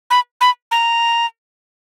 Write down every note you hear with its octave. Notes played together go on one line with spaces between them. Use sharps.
B5
B5
A#5